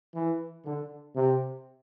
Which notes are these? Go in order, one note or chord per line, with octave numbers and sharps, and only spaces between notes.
E3
D3
C3